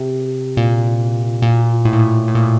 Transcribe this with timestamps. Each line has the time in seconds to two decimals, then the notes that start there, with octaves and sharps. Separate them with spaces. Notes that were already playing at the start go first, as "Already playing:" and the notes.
Already playing: C3
0.57 A#2
1.42 A#2
1.85 A2
1.93 A#2
1.99 A2
2.28 A2
2.35 A#2
2.43 A2